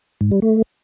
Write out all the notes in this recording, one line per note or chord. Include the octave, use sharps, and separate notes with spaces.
G#2
G3
A3